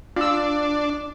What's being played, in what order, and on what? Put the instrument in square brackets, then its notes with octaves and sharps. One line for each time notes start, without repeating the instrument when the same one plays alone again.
[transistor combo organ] D4 [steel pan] F4 E6